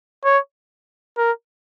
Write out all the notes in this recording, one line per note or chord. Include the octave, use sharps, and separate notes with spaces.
C#5
A#4